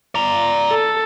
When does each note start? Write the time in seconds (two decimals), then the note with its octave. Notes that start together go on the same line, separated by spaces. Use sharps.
0.15 D5 A#5
0.70 A4